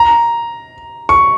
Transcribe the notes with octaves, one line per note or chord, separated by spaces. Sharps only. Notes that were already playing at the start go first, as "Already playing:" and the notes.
Already playing: A#5
C#6